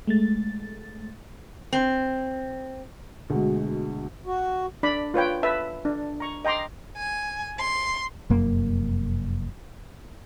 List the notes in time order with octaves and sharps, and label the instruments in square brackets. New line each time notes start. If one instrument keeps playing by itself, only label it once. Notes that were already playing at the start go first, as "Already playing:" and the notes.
[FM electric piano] G#3 A3 A6
[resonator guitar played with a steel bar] C4
[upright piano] D2 B2 G#3
[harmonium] F#4
[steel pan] D4 D5 B5
F4 B4 C#5 G5
B4 E5 A5
D4
A#5 C#6
D#5 G5 A#5 C6 D6
[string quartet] G#5
C6
[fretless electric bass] F1 F#2 A#3